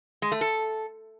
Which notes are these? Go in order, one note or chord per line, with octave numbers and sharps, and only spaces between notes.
G#3
A3
A4